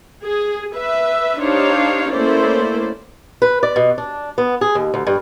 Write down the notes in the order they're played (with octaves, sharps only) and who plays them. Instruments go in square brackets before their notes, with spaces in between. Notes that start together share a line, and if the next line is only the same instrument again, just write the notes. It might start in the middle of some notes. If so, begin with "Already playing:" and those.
[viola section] G#4
B4 E5
D4 D#4 G4 C5 C#5 F5
A3 A#3 C#4 E4 C5 D5
[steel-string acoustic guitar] B4
D5
B2
D4
B3
G#4
D#2
D2
G2